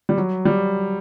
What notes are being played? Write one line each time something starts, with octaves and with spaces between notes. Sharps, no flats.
G3
F#3
G3